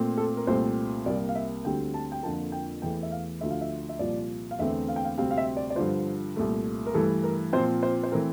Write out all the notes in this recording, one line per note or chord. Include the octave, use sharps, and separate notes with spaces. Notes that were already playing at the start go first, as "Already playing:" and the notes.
Already playing: A#2 A3 C4
A4
A#4
C2 A#2 A3 C4 C5
C2 C3 G3 A#3 D5
F5
E5
D2 D3 G3 C4 G5
A5
G5
F2 D3 F3 A#3 A5
G5
E2 E3 A3 G5
E5
F5
D2 D3 F3 E5
F5
E5
E5
C2 A#2 F3 D5
F5
E2 D3 A3 C4 E5
F5
G5
F5
D2 C3 G3 C4 F5
F5
E5
D5
D5
G2 D3 F3 C5
C2 A#2 A3
A#4
G2 E3 A3 A4
A#4
A#2 F3 C4 C5
C5
C5
E3 A3 C4 A#4